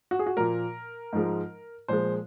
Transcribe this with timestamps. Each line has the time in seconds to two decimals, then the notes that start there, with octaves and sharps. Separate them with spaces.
0.11 F#4
0.19 G#4
0.26 F#4
0.37 A#2 F3 A#3 A#4
1.13 G#2 F3 G#3
1.88 A#2 F3 G#3 C5